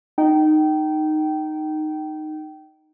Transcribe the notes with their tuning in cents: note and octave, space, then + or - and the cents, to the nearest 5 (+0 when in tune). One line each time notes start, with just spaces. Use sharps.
D#4 -10 G5 -25